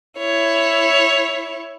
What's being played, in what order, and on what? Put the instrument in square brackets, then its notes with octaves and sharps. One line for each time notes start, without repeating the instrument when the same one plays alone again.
[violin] E4 C#5